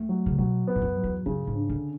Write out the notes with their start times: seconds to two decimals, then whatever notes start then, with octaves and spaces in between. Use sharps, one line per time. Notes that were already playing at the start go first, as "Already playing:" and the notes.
Already playing: A3
0.09 F#3
0.26 C#3
0.38 B2 F#3
0.67 B3
0.75 G#2
0.82 F#2
0.97 F#3
1.04 E2
1.26 F#2 C#3
1.47 G#2
1.55 D4
1.69 D3